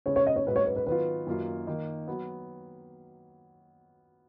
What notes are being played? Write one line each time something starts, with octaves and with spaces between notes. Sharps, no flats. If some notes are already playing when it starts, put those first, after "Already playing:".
C#3 G#3 C#4 C#5
C#5
D#5
C#5
G#2 F#3 C#4 B4
C#5
B4
B4
D#3 F#3 B3 F4 B4
F#2 D#3 F#3 A#3 F4
D#3 A#3 D#4
F#3 B3